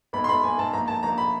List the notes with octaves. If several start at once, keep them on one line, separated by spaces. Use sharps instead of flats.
B1 B5
C6
B1 B5
B1 G#5
B1 A5
A#1 A#5
A#1 A5
A#1 A#5
B5